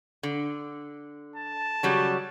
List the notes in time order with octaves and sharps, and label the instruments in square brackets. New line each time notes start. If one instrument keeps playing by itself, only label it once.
[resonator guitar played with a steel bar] D3
[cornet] A5
[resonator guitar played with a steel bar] C#3 F#3 G3